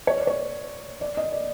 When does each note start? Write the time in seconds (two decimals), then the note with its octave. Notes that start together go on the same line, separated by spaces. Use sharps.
0.07 C#5
0.17 D5
0.27 C#5
1.01 D5
1.17 D#5
1.32 D5